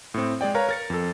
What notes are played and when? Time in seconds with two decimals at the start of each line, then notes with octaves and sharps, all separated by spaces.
0.14 A2 C4
0.41 G#3 G#4 D5 G5
0.55 A#4 B4 C#5 F5 A#5
0.69 A#4 A6 C#7
0.90 F2 A4